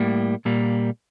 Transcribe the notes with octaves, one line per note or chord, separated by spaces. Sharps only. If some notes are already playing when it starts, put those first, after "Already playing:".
Already playing: A2 G3 A#3
A#2 G3 A#3